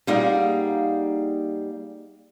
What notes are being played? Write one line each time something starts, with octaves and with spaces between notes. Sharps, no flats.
G3 A#3 D#4 G#4 F5 F#5